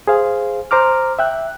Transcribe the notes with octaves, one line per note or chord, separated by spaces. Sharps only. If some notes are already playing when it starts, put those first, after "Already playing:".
G#4 C5 F5
C5 A#5 D6 F6
E5 G5 F#6